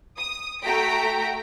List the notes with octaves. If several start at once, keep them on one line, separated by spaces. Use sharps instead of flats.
D#6
A3 F#4 G5 A#5 B6 D7